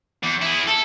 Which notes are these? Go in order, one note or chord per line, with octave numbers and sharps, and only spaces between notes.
E2
E4 G#4
A4